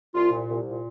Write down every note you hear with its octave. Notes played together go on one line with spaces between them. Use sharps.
C2 F4
A#2
C2
A#2